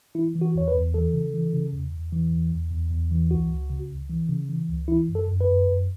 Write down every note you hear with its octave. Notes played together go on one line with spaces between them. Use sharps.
E3 E4
E3
F#4
E2 C#5
B4
E2
E3 A4
C#3
E3
C#3
E2
E2
E3
E2
E2
E2
E2
E3
C#2 F#4
C#2
C#3
C#2
E3
C#3
E3
C#2
E3 E4
F#2
A4
F#2
B4
F#2
F#2